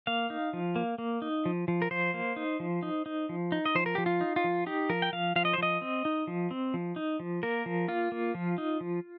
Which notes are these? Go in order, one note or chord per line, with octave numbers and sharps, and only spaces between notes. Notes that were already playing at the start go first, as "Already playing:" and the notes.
A#3 F5
D#4
F3
A#3
A#3
D#4
F3
F3
A#4
F3 C5
A#3
D#4
F3
D#4
D#4
F3
D#4
D#5
F3 C5
A#4
F3 G4
F4
D#4
F4
F3
D#4 G4
F3 A#4
G5
F3 F5
F3 F5
D#5
C5
F3 D#5
C4
D#4
F3
C4
F3
D#4
F3
A#3 A#4
F3
A#3 F4
A#3
F3
D#4
F3